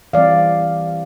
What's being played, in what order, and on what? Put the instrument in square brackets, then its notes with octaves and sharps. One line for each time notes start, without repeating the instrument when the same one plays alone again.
[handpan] E3 G3 C4 D5 F5